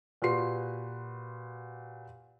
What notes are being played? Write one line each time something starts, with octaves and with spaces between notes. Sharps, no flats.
A#2 F#4 G4 B4 C6 C7